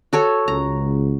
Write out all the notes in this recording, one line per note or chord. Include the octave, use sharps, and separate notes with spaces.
F#4 A4 C#5
C#2 A#5